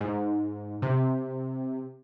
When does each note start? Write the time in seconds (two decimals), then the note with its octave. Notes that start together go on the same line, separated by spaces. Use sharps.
0.01 G#2
0.82 C3